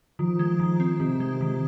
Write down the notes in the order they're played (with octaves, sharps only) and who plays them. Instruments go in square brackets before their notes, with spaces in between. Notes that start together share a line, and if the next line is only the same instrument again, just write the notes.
[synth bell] D#3 [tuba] F3
[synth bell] G#3
D#3
C4
[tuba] C3 [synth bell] D#3
[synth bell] G#3
D#3